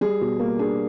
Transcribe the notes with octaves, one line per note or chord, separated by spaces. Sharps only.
G3 G#4
B2
A#3
D4 G#4